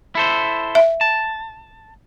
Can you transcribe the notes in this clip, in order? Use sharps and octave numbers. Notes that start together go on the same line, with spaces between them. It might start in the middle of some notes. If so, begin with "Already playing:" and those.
E4 A4 C5
E5
A5